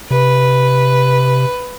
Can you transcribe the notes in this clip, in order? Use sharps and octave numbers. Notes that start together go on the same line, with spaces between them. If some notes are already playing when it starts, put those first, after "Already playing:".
C3 B4